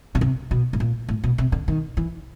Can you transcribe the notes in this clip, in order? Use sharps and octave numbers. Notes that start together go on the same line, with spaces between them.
B2
C3
B2
A2
A#2
A2
B2
C3
D3
D#3
E3